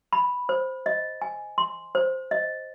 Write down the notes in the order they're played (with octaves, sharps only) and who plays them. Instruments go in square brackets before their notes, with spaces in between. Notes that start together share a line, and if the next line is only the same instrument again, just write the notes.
[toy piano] B5
C5
D#5
G#5
C6
C5
D#5